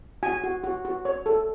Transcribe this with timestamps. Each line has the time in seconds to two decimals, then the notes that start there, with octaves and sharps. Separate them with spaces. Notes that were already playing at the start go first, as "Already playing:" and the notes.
0.23 F#4 G#5
0.44 F#4
0.64 F#4
0.85 F#4
1.05 C#5
1.26 A4